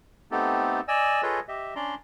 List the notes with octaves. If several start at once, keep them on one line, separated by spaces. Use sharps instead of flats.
A3 B3 C4 D#4 G4 A4
D5 D#5 G#5 E6
F4 G#4 A4 B4 C#5 D#5
G4 D#5 E5
C#4 D4 D5 A#5 C6